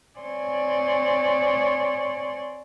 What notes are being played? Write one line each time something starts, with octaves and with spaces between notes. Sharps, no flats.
C4 C#5 D5 G#5 C6